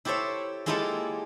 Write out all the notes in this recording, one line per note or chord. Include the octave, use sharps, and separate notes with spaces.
E4 G4 A4 C5 C#5 E5
G#3 A#3 E4 F4 G4 A4